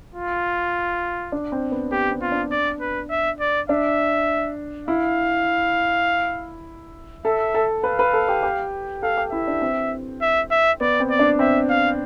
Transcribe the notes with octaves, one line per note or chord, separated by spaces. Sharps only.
F4
D4
C4
B3
B3 G4
C4
F4
D4
D5
B4
E5
D5
D4 E5
E4 F5
A4 E5
A4
B4 F5
B4
A4
G4
G4
A4 F5
G4
E4 E5
D4
C4
E5
E5
B3 D5
C4
D5
D4
C4 E5
F5